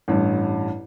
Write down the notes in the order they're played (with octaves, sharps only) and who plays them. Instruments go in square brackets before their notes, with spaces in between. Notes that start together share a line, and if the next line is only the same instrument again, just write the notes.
[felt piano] A1 G2